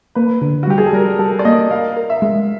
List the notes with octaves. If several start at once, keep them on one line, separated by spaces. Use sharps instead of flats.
A#3 B4
D3
F#4
G3 G4
G#4
A4
G3 A#4
G3 A4
D5
A#3 D#5
A#4 F5
A#4
E5
G#3